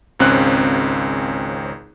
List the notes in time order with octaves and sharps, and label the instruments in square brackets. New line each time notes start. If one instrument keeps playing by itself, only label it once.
[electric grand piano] G#1 C#2 C4 C#4 F#6